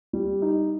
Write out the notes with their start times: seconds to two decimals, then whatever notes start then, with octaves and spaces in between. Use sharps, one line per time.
0.13 G3
0.42 D#4